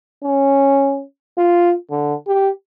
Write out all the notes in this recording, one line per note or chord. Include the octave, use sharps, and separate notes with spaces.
C#4
F4
D3
G4